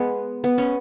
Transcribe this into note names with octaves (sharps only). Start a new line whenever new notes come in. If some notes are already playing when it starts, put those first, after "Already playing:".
Already playing: G#3 B3
B3
C#4